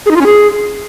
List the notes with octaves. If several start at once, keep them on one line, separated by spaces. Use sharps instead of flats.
G#4
D#4
F4
C#4
G#4